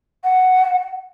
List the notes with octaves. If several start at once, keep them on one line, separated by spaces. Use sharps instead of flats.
F#5